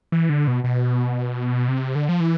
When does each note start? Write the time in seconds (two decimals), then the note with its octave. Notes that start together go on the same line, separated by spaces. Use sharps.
0.12 E3
0.29 D3
0.47 B2
0.64 B2
1.68 C3
1.95 D3
2.09 F3
2.20 E3